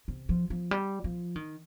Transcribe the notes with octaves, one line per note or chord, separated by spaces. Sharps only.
C3
F3
F3
G3
F3
D#3